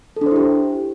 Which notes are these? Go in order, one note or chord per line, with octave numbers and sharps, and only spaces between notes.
D4 E4 G4 A4 C5